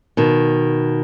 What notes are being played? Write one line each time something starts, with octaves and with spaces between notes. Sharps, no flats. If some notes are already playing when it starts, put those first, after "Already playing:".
B2 D#3